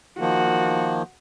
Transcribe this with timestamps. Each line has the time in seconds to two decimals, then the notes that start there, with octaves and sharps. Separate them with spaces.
0.20 D#3 F3 A#3 F#4